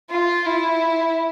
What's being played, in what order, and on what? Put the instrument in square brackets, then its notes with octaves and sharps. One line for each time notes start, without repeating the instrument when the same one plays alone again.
[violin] F4
E4